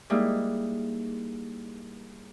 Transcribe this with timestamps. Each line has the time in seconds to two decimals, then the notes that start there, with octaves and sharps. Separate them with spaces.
0.10 G3 G#3 A#3 D#4 E4